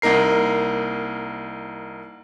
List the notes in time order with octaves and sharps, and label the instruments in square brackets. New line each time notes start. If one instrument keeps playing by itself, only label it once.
[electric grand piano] C2 A#3 D#4 A#4 C7